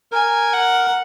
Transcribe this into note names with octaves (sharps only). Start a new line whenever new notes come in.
A#4 G#5
F#5